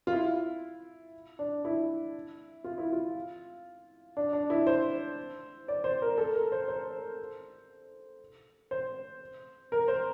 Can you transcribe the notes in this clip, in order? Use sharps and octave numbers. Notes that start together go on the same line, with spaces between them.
F4
E4
D4
E4
F4
E4
F4
D4
D4
E4
C5
D5
C5
A#4
A4
A#4
C5
C5
C5
A#4
C5